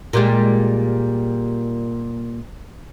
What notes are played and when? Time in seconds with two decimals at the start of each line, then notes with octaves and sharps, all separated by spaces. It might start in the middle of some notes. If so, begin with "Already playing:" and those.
0.13 A#2 G3 G#3